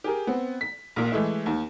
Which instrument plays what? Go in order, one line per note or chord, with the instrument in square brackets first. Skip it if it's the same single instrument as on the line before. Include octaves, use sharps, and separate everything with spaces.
[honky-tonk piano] G4 G#4 A#4
B3 C4
B6
A#1 A#2
E3 G#3 A3 E4
D#2